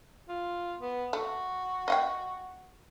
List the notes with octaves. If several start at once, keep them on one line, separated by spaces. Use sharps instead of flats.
F4
B3
A3 F#4
D#5 F#5 G5